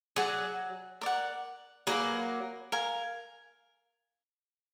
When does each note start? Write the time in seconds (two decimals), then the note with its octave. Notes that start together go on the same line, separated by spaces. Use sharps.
0.16 F#3 G#4 D5 F#5
1.01 A#4 D5 F#5
1.87 F#3 A#3 G#4 B4 F5
2.72 A#4 F5 G#5